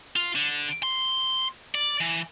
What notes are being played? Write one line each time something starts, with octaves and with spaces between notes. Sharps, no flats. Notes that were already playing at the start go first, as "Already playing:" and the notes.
F4
D3
C6
D5
E3